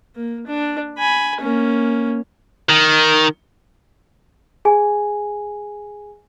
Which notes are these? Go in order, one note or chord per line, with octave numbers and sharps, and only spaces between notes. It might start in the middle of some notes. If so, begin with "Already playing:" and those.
A#3
D4
G#5 B5
A#3 C#4
D#3
G#4 G#5